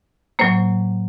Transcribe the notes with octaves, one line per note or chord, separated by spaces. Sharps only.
A2 F#3 A#3 C5